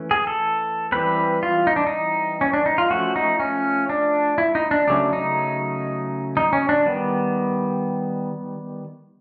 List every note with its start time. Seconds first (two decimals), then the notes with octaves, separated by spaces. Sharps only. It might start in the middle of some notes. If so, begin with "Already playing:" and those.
Already playing: E3 A3 C#4
0.11 G#4
0.27 A4
0.92 E3 G3 C4 B4
1.43 F4
1.67 D#4
1.76 D4
1.87 D#4
2.41 C#4
2.53 D4
2.66 D#4
2.78 F4
2.90 F3 A3 C#4 F#4
3.16 D#4
3.40 C#4
3.89 D4
4.38 E4
4.55 D#4
4.71 D4
4.88 C#3 F#3 A3 C#4 D4
5.13 D#4
6.37 D#4
6.53 C#4
6.69 D4
6.86 D#3 G3 B3